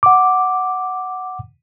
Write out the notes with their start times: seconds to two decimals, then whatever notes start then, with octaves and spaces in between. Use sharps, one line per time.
0.03 F#5 D6